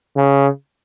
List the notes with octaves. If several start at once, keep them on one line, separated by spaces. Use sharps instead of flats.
C#3